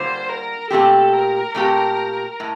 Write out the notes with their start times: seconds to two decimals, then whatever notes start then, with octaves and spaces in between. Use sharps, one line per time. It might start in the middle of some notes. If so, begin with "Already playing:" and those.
Already playing: D3 G3 A#3 F4 C5
0.29 A#4
0.70 A#2 A3 C4 G4 A4
1.13 A#4
1.55 A#2 A3 C4 G4
2.40 A2